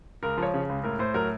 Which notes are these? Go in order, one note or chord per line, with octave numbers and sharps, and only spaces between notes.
C#2 A#4
F3
C#5
C#3
C#2
A2 A#4
A2 C5
F#3 A#4